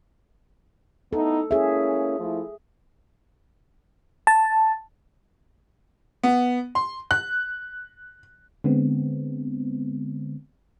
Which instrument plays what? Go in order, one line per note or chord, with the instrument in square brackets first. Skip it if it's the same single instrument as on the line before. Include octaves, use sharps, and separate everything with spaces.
[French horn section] B3 D#4 E4 [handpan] A4
[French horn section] A#3 C#4 E4 [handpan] G#4 E5
[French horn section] F3 A3 E4
[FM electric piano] A5
[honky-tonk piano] B3
C6
F#6
[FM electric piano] D3 G#3 B3 C4